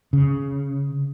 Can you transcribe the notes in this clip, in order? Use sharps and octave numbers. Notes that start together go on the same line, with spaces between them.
C#3